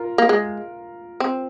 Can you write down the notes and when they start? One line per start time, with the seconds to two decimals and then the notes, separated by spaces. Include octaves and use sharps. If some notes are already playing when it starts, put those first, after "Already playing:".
Already playing: F4 A#4
0.18 A#3
0.29 G#3
1.20 C4